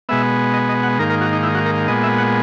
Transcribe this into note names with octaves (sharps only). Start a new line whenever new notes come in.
B2 G#3 B3 E5
D#5
D#5
F#5
G#2 D#3 A#3 A#4
A#4
F#4
D#4
E4
F#4
A#4
A#2 G#3 B3 D#5
E5
F#5